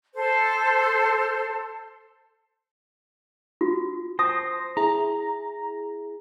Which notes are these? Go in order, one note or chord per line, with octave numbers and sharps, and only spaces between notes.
A4 C5
F4 F#4
C5 A5 D#6 A#6
E4 G#4 A#5